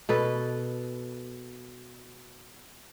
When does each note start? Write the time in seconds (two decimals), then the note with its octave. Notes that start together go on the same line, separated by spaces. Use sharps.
0.09 B2 A4 B4